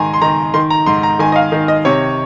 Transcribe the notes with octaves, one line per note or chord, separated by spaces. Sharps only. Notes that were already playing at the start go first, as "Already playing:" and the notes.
Already playing: G#2 D#3 G#5 A#5 C6
C6
D#3 A#5
D#3 C6
A#5
G#2 C6
A#5
D#3 G#5
D#5
F5
D#3
D#5
C3 C#5